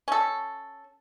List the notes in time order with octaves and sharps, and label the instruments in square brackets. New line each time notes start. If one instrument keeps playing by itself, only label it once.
[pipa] C#4 A4